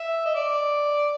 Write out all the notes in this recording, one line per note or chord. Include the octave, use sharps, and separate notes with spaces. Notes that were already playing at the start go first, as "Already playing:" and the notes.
Already playing: E5
D#5
D5